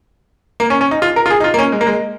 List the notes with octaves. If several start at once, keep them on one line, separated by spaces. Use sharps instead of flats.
A#3
C#4
C#4
D#4
F4
A#4
F4
G#4
D#4
F4
A#3
C#4
G#3
A#3
G#3